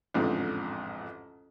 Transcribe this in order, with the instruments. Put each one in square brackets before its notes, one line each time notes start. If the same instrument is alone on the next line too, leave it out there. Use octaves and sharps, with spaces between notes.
[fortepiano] A1 F2 G#2 D3